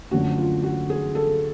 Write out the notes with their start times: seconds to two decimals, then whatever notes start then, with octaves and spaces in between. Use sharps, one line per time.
0.11 F#2 D3 F3 A3 C#4 F#4
0.38 F4
0.63 F#4
0.90 G#4
1.15 A4